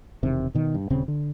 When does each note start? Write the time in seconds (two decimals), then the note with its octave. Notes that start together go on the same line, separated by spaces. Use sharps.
0.23 E1 C3 D#3
0.55 B2 D#3
0.74 G2
0.90 D#1 C#3 C4
1.08 D3